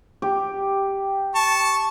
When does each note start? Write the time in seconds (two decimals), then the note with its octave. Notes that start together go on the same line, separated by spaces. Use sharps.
0.22 G4
1.35 A5 C#6